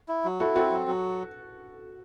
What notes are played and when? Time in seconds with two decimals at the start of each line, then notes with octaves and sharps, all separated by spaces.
0.08 E4
0.24 F#3
0.40 E4 F#4 A4
0.56 C4 F#4 A4
0.71 F#3
0.88 F#3